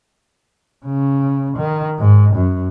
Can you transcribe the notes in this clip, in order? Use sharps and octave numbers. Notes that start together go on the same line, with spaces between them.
C#3
D#3
G#2
F#2